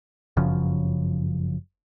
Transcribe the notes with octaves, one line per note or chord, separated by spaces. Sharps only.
G1 F#2 C#3 F3